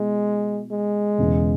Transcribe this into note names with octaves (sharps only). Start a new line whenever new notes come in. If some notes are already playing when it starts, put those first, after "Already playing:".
Already playing: B2 G#3 E4
G#3
E1 E2 C#3